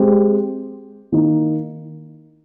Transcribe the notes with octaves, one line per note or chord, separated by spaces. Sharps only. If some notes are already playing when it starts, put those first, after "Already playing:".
Already playing: G#3 C4 G4
D#3 A#3 D#4